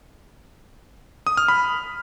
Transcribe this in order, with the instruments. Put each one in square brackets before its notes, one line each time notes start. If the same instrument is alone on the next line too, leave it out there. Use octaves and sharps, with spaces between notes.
[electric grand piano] D#6
F6
B5